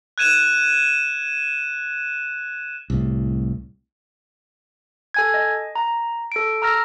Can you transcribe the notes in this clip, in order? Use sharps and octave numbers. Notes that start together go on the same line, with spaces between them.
F#6 G#6 D#7 E7
C2 A2
A4 G#5 G#6
D#5
A#5
A4 D7
A#5 E6 F6 A#6